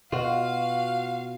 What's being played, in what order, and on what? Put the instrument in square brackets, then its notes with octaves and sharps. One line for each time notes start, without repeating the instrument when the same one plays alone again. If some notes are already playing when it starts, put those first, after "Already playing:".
[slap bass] B2 [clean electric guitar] F4 F#4 [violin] F5